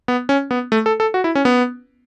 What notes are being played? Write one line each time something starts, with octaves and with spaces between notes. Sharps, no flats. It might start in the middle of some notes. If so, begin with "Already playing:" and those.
B3
C#4
B3
A3
A4
A4
F#4
E4
C#4
B3